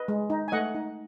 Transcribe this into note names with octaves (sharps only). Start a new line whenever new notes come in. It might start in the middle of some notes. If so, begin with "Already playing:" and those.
Already playing: B4 D#5
G#3
D#4
G#5
A3 D#5 F#5
D#4